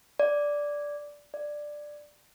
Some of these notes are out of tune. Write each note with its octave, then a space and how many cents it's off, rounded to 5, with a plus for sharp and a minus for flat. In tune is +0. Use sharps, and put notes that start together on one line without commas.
D5 -5
D5 +10